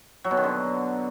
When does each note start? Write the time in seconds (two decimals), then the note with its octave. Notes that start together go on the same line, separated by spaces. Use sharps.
0.24 F#3
0.31 B2
0.37 D#3
0.44 D3